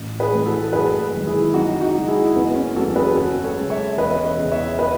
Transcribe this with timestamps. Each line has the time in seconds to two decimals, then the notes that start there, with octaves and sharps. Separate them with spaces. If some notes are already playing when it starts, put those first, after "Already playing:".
Already playing: A1
0.20 G#4 B4
0.33 A2 E3 A3
0.46 F#4 A4
0.63 A4
0.73 F#1 G#4 B4
1.14 F#2 D#3 G#3
1.27 E4 G#4
1.54 F#2 D#4 F#4
1.81 D#4 F#4
1.95 C#3 G#3
2.08 E4 G#4
2.36 F#1 B3
2.55 C#4
2.76 E2 B2 F#3 A3 F#4 A4
2.96 G#4 B4
3.16 F#2 A4 C#5
3.44 A4 C#5
3.57 C#3 G#3
3.70 C#5 E5
3.97 E1 B4 D#5
4.25 C#5 E5
4.38 E2 C#3
4.52 C#5 E5
4.79 B4 D#5